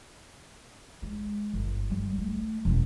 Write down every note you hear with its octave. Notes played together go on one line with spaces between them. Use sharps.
G#3
G1
G3
A3
E1 C#4